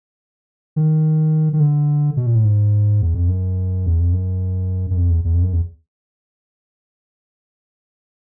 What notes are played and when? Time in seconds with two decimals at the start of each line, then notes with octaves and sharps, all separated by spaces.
0.76 D#3
1.53 D#3
1.60 D3
2.17 B2
2.26 A#2
2.35 A2
2.44 G#2
3.02 E2
3.14 F2
3.28 F#2
3.86 E2
4.00 F2
4.13 F#2
4.90 F#2
4.97 F2
5.10 E2
5.24 E2
5.34 F2
5.43 F#2
5.53 E2